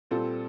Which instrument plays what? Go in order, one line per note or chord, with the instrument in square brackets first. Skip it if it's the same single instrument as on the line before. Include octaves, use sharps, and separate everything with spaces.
[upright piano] A#2 G3 C4 F4 A4